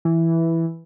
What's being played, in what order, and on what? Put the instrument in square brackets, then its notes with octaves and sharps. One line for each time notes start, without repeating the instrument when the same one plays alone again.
[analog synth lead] E3